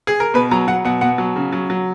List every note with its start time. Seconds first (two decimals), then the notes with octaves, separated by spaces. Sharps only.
0.07 G#4
0.20 A#4
0.34 B2 B4
0.51 F#3 A#5
0.68 F#3 F#5
0.84 B2 F#5
1.01 B2 F#5
1.18 F#3
1.36 C#3
1.52 F#3
1.70 F#3